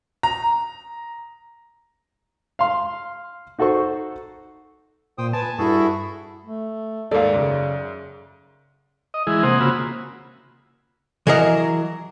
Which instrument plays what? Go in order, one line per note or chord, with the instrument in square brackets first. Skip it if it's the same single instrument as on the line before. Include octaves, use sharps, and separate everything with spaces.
[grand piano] A#5
[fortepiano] F5 C6
D#4 F#4 A4 C5 C#6
[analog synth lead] A#2 [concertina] C5 G5 D#6
[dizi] B4 [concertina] G#5 [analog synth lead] A5
[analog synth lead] G2 [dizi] E4 [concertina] F#4 G#4 A4
[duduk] A3
[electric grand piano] D#2 G#2 [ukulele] A4 A#4 F5 [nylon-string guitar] D5
[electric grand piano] F#2 [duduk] C#3
[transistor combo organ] D#5
E3 G#3 E4 G#4
C3 A#3 C5 F#5 G#5 D#6
C#3 A#3 F4 F#4 B5 E6
[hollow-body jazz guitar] E3 F#3 G#4 A#4 D#5